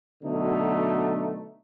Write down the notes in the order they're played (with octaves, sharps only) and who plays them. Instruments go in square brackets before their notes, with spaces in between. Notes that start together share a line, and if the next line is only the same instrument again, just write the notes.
[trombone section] B2 D3 F#3 A3 D#4